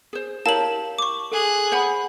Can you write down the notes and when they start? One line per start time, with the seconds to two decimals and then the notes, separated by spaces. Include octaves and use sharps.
0.13 G#4 C5
0.46 E4 G4 A#4 C#5 F5 A5 F#7
0.98 C#6 D6
1.32 G#4 A4 F#6
1.72 C5 F#5 B5